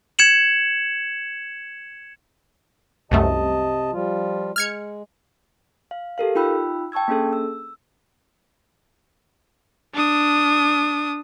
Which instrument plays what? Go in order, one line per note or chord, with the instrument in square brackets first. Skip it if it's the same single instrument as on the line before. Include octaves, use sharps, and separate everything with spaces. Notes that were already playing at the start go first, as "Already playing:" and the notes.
[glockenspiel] G#6 C#7 E7 F#7
[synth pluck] C2 F#2 A3 [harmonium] C3 D#5 A5
[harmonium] F3 G3 F4
[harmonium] G#3 [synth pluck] F6 G#6 C#7
[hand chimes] F5
G4 A4 A#4 F5
D#4 F4 G5 B5 E6 F#6
G5 A5 C#6 E6 G#6
A#3 C#4 D4 G#4 A4
E6
[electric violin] D4 D#6